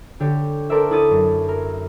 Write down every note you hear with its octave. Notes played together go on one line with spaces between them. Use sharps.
D3 G4 C#5
A4 A#4 C5 D5 E5
E4 C#5 D#6 A6 D#7
F#2
A#4